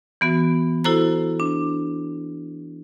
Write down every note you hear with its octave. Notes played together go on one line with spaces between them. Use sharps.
E3 B3 F#4
E4 F#4 A4 C5 A#5
D4